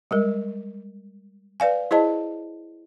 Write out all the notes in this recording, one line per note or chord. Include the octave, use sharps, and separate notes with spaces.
G3 G#3 A#4
B4 D5 F5 G#5
E4 G#4 C5 D#5 A5